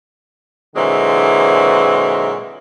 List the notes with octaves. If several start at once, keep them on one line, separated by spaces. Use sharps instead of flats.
A#2 D3 E3 F#3 G#3 C4